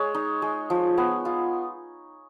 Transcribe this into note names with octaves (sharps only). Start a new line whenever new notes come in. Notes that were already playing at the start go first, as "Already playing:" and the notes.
Already playing: G#3 C#5
D#4
G#3
F3
B3
F4